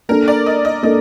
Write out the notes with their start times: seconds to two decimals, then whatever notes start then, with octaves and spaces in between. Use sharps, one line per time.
0.09 A#3 D4 A4 A#4
0.28 D5
0.46 D#5
0.65 D#5
0.83 A#3 D4 A4 D#5